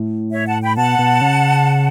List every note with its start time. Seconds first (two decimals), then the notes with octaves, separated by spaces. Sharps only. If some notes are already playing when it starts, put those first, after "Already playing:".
Already playing: A2
0.32 C#5 E5
0.47 F#5 A5
0.62 G5 B5
0.77 B2 F#5 A5
0.99 B2
1.21 C#3